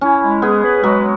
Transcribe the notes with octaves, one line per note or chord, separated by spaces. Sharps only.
C#4 E4
G#3
B3 G#4
B4
F#3 G#3